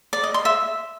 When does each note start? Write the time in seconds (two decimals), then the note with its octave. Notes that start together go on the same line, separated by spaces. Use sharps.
0.13 D5
0.24 D#5
0.34 C6
0.45 E5